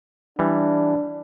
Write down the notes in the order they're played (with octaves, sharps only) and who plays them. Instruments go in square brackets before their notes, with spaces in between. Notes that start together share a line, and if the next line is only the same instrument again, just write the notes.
[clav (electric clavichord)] E3 G3 [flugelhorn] D4